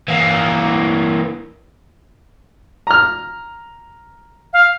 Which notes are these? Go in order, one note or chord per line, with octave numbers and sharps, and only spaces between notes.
E3 A#3
A#5 F6
F5